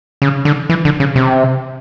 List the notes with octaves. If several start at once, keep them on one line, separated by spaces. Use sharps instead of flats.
C#3
D3
E3
D3
C#3
C3